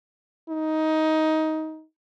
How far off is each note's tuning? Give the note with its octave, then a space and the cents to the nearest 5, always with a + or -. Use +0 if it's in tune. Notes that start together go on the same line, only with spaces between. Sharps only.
D#4 +15